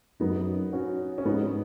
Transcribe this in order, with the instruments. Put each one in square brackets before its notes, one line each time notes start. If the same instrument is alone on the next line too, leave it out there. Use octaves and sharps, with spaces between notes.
[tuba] F#2 [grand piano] B3 D#4
[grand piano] C#4 F#4
C#4
[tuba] G#2 [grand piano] B3 D#4